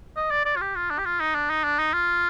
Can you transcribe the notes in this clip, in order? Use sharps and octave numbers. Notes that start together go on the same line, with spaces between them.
D#5
D5
D5
F4
G4
F4
D4
G4
F4
D#4
D4
D#4
D4
D#4
F4